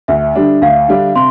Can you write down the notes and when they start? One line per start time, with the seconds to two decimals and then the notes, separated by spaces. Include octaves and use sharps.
0.08 D2 E5
0.35 D3 G3 D4
0.62 D2 F5
0.88 D3 G3 D4
1.16 C3 C6